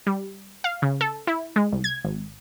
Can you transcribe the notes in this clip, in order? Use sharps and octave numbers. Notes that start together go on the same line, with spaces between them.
G3
F5
C#3
A4
E4
G#3
C2
G#6
G#1